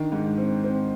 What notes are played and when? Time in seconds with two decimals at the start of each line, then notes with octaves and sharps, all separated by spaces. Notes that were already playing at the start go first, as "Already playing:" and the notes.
Already playing: D#3 D4
0.12 G#2
0.38 C4
0.64 C4